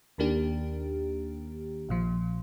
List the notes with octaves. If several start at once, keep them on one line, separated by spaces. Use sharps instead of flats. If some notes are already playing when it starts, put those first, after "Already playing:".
D#2 D#3 A#3 D4 G4
A#1 A#2 F3